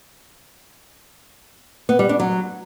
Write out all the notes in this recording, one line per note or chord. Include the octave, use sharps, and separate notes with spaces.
B3
G3
D4
F#3